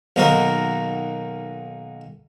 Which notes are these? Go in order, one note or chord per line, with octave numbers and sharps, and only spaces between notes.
B1 D#3 A#3 D#4 F#4 A#4